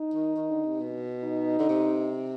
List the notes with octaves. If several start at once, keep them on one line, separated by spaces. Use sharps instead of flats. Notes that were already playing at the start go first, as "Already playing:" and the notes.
Already playing: D#4
D#3
D#3
D3
C3
B2
D#4
D3
C3